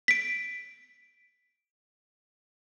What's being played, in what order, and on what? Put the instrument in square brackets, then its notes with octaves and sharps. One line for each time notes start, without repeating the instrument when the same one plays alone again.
[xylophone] B6 D7